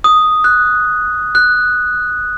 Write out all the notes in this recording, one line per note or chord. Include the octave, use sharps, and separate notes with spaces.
D#6
F#6
F#6